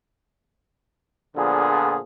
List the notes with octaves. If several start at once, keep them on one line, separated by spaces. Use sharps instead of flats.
A#1 A#2 D3 F3 B3 G#4